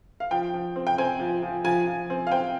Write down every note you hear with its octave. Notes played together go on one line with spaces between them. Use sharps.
F5
F3 G5
F3
C4
G5
C4 G#5
F3
F3
F3 G#5
F3
C4
F5
C4 G5